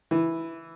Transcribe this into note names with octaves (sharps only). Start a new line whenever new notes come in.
E3